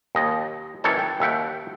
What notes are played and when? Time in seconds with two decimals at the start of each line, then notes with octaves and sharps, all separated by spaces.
0.15 D#2 D#5
0.84 F#2 D#3 E3 A4 C#5 A5
0.99 G5
1.20 D#2 E5 F#5 G5